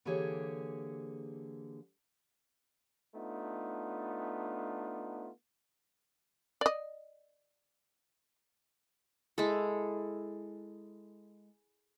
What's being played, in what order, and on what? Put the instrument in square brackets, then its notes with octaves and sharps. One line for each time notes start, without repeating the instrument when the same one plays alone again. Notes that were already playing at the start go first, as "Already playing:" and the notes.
[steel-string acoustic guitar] D3 E3 A#3 G4 G#4 C#5
[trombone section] A3 B3 D4 D#4 F4
[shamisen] D5 D#5
[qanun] G#3 E4 A4